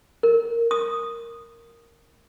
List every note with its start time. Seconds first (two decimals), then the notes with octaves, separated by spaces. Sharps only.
0.23 A#4
0.71 D#6